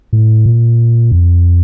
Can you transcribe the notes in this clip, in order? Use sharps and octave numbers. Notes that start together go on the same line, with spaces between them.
A2
A#2
F2